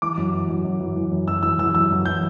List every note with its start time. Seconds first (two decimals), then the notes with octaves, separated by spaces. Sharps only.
0.02 E3 D6
0.17 F#2
0.33 E3
0.49 F#2
0.65 F#2
0.80 E3
0.96 E3
1.11 F#2
1.28 F#2 E6
1.43 E3 E6
1.59 E3 E6
1.74 F#2 E6
1.91 F#2
2.06 E3 G6